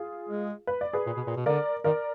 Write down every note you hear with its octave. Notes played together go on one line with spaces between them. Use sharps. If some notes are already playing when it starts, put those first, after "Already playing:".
Already playing: F4 G#4
G#3
B4
D5
G#4 B4
A#2
B2
A#2
B2
D3 A#4 D5
D#3 A#4 D5